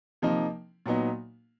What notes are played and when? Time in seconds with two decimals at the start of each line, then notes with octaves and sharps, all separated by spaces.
0.22 C3 F3 A#3 D#4
0.86 A#2 F#3 B3 D#4